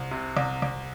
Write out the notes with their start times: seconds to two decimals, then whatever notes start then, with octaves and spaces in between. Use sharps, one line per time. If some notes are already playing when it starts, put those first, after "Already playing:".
Already playing: C2
0.11 C3
0.37 C2
0.62 C2